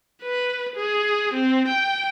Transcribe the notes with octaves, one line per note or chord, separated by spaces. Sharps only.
B4
G#4
C4
G5